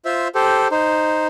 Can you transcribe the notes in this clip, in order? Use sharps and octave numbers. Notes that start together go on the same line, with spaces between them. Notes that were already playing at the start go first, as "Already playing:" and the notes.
F4 C5 E5
G4 A4 C5
D#4 C5